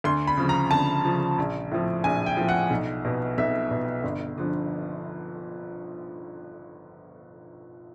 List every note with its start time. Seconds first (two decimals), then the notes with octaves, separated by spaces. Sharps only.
0.04 D2 C6
0.27 B5
0.37 C#3 F3
0.49 A#5
0.71 D2 A5
1.05 C#3 F3
1.38 A#1
1.72 A2 F3
2.04 A#1 G#5
2.26 G5
2.37 A2 F3
2.49 F#5
2.70 B1
3.05 B2
3.38 B1 E5
3.71 B2
4.03 G1
4.38 D3 F3